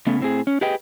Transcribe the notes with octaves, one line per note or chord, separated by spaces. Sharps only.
C#3 A3 B3 C#4
A2 C4 G#4
C#4
G4 G#4 B4 D#5 G5